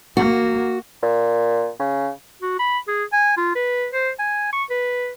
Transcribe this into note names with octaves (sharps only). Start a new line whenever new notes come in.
A#3 F#4
A#2
C#3
F#4
B5
G#4
G#5
F4
B4
C5
G#5
C#6
B4